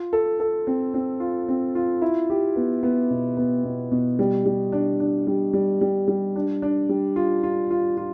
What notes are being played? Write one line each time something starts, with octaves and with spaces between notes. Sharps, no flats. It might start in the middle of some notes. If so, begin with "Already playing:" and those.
Already playing: F4
A4
A4
C4
C4
F4
C4
F4
E4
G4
B3
B3
B2
B3
B2
B2
G3
G3
D4
D4
G3
G3
G3
G3
D4
D4
G3
F4
F4
F4
F4